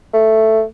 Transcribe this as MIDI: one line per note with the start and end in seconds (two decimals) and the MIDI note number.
0.13 0.63 57